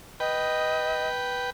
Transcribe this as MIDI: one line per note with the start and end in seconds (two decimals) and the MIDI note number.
0.20 1.50 71
0.20 1.09 75
0.20 1.50 79